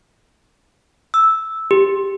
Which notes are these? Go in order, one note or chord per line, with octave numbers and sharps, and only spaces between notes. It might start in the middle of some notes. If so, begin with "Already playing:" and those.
E6
G4